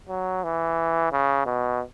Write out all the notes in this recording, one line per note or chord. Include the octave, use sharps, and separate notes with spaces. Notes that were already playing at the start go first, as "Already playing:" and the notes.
F#3
E3
C#3
B2